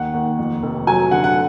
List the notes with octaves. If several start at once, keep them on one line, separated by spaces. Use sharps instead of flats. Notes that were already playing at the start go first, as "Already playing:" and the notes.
Already playing: D#2 F#5
D#2
F2
F1
F#3 G#5
D3 F#5
F#5